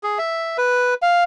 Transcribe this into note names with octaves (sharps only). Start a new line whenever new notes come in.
G#4
E5
B4
F5